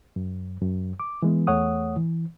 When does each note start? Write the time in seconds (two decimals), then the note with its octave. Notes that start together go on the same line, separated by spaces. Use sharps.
0.16 F#2
0.61 F#2
1.00 D6
1.22 E3 G#3 B3
1.47 E2 A3 C#5 F#5 D#6
1.96 E3